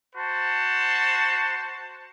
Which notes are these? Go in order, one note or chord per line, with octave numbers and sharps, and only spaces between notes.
F#4 C5 A5